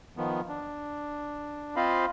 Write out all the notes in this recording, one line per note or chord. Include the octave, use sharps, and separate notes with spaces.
D#3 F3 B3
D4
C4 F4 C5 D#5 F5 B5